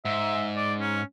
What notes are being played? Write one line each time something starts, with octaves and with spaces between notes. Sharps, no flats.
G#2 E5
D5
C#4